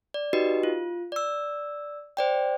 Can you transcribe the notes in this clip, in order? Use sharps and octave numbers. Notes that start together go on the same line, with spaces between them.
D5
D#4 F#4 G4 B4 D#5
F4
D5 E6
C5 D5 G5